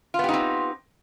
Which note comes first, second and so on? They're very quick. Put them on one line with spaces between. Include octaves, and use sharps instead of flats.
F4 B3 G4 D#4 C4